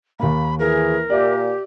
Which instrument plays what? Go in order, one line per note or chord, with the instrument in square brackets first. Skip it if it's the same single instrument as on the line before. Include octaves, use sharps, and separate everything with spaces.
[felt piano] D#2 A#3 [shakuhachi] B5
[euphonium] E3 [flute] G#4 [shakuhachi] A#4
[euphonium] A#2 [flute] G4 [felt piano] D5 E5 D6